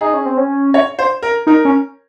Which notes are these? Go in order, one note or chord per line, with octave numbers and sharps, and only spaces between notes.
D#4 G#4
C#4
C4
C#4
C#5
C5
A#4
D#4 A#4
C#4